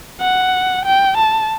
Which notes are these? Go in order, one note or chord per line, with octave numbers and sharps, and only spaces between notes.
F#5
G5
A5